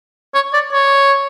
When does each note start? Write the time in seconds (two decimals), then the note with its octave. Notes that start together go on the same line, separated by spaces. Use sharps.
0.34 C#5
0.53 D5
0.72 C#5